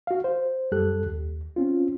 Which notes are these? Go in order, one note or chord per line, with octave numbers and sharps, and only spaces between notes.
F#4 F5
C5
F#2 G3 G4 A4 F#6
D#2
C4 C#4 F4